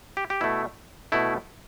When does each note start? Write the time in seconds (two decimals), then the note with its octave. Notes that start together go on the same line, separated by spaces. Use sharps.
0.17 G4
0.30 G4
0.41 B2 A3 E4
1.12 B2 A3 E4